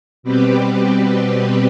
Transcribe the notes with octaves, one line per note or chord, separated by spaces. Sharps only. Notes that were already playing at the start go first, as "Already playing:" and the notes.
B2 G3 C4 G4 B4